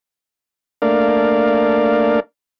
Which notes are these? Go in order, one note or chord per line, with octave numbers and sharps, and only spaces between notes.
A3 A#3 D4 A#4 D5 F5